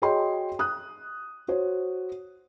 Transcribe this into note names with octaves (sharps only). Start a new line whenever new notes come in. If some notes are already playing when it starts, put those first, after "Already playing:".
F#4 G#4 C#5 D#5 G5 C6
D#6 F#6
F#4 C5 C#5